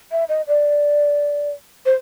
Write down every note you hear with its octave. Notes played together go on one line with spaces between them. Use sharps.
E5
D#5
D5
C5